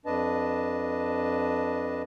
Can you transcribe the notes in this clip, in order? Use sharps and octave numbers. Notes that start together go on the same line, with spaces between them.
F2 D4 B4 D#5 A5